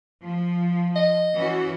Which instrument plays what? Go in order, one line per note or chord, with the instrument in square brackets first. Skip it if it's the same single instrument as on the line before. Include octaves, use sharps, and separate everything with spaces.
[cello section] F3
[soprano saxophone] D#5
[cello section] E3 C#4 F#4